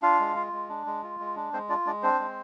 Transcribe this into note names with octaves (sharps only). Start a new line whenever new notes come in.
D4 F4 F5
G#3
F4
G#3
D4
G#3
F4
G#3
D4
G#3 C4 C5
D4 F4 D5
G#3 D4 D5
C4 D4 C5
G#3